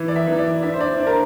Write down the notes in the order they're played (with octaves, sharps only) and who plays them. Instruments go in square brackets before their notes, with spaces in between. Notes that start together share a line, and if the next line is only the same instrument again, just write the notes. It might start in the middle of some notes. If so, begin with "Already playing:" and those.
Already playing: [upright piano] E3
D5
E5
E3
D5
D4 E5
C5
D5
D4 C5
A#4